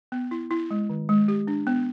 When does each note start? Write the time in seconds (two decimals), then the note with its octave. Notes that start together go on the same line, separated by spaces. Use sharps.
0.12 B3
0.31 E4
0.51 E4
0.71 G#3
0.90 D#3
1.09 G#3
1.28 G4
1.47 D4
1.67 B3